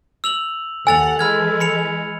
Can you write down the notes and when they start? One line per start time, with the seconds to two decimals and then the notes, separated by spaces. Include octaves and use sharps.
0.24 E6 F7 F#7
0.87 D#2 A4 F#5 G#5 E6 A6 F7
1.19 E3 G#3 B5 F6 G#6
1.60 B5 C#7 F7